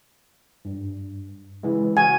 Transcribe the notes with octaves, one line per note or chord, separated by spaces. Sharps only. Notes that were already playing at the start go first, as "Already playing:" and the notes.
G2
C#3 E3 G#3
F#4 G#5